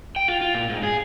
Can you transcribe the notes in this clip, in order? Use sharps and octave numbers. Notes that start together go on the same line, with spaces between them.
G5
F4
F4
A#2
G#2
G#4